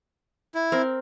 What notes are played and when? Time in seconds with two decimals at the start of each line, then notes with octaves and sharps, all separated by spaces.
0.55 E4
0.72 C4 A#4